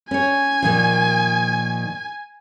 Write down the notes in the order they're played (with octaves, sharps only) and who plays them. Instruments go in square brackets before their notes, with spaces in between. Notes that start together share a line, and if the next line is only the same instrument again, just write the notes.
[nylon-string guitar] C#4 C#5 [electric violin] G#5
[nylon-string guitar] A#2 D#3 F3